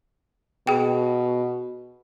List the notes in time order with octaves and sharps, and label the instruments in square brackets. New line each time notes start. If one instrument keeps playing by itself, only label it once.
[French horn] B2 [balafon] G#4 G5